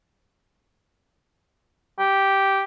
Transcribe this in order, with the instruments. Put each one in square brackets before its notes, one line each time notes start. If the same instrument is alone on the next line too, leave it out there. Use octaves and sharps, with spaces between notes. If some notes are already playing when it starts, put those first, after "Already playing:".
[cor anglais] G4